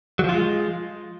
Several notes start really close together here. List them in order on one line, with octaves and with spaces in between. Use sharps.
F#3 F3 F4 G#3